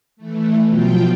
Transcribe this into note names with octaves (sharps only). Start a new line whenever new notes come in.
E3 A3
B2 F3 F#3 F4 G5